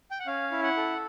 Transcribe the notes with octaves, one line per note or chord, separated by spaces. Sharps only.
G5
F#5
C#4 F5
E4
F#5
A4